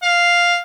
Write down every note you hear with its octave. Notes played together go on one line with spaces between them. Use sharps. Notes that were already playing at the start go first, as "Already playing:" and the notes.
F5